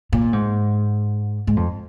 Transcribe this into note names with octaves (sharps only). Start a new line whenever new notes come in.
A#2
G#2
G#2
F2